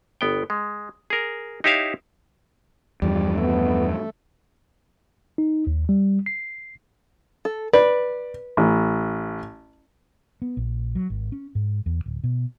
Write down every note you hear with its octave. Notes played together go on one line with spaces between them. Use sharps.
G1 B3 G5
G#3
G#4 A#4
D#4 E4 G4 C#5 E5 F5
E2 G2 F3 G3
A3 B3
D#4
D#2
G3
C7
A4
B4 D5
A1
B3
A#1
F#3
G#1
C#4
G#2
E2
D1
B2